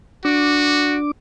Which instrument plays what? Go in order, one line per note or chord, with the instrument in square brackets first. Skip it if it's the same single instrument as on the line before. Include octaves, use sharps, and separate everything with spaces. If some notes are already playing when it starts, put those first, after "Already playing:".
[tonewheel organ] D4 D6 [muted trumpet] F#4